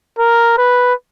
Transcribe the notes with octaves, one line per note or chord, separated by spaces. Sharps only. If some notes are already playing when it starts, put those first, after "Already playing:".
A#4
B4